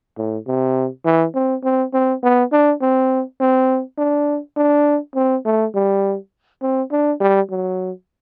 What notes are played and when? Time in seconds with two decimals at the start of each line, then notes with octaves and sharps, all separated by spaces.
0.17 A2
0.47 C3
1.05 E3
1.35 C4
1.63 C4
1.93 C4
2.23 B3
2.52 D4
2.81 C4
3.40 C4
3.98 D4
4.57 D4
5.15 C4
5.45 A3
5.74 G3
6.62 C4
6.92 D4
7.20 G3
7.50 F#3